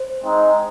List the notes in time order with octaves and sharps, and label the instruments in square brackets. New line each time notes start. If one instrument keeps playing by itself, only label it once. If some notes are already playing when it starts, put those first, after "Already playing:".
Already playing: [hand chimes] C5
[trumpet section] G#3 C4 D#4